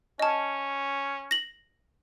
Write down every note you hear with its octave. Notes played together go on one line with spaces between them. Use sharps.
C#4 D#5 A5
A#6 F#7